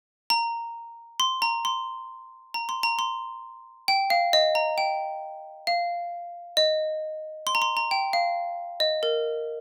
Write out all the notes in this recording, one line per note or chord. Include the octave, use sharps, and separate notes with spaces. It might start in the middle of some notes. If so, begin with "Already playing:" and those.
A#5
C6
A#5
C6
A#5
C6
A#5
C6
G5
F5
D#5
A#5
G5
F5
D#5
C6
A#5
C6
A#5
G5
F5
D#5
A#4